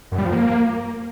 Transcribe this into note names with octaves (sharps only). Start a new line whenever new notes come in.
F#2
G3
F3
A#3